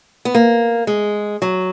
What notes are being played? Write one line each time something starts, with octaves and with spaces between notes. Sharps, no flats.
B3
A#3
G#3
F#3